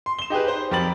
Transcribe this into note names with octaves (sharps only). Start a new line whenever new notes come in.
C6
E7 G7
D#4 G4 G#4 B4
C5
F2 G4 A#4 B5 A6 F#7